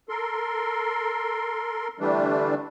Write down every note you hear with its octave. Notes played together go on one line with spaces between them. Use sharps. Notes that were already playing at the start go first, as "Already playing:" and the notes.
A4 A#4 C6
D3 E3 G3 A3 D4